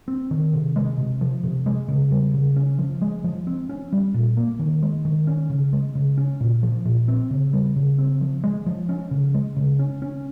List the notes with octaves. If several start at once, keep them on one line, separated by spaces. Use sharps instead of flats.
C4
D#3
C3
G#3
C3
F3
C3
G#3
C#3
G3
C#3
C#4
F3
G#3
F3
C4
C#4
G3
A#2
A#3
D#3
G#3
D#3
C#4
C#3
G#3
C#3
C#4
A#2
F3
A#2
C4
C#3
G3
C#3
C4
F3
G#3
F3
C#4
C#3
G#3
C#3
C#4
C#4